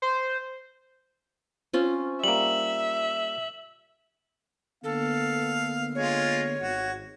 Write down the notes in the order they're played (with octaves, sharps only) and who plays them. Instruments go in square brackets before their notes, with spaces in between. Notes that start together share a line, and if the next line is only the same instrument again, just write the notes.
[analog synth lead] C5
[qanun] C4 C#4 F4
[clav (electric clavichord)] G3 A#3 [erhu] E5 [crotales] F#7
[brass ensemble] D3 A#3 B3 [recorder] A4 [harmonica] F5
[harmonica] G#3 F4 [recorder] C#5
[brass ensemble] G#1 [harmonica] F#4